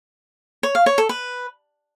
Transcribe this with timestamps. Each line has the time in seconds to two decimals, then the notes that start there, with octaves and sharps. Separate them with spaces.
0.63 C#5
0.75 F5
0.86 C#5
0.98 A4
1.09 B4